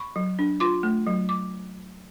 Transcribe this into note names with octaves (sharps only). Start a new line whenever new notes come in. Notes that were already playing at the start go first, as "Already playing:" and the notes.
Already playing: B5 C#6
F#3
D4
F4 C6 D6
A3
F#3
D6